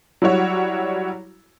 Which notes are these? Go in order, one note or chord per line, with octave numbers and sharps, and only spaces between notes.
F#3 G3 E4 F#4 C#5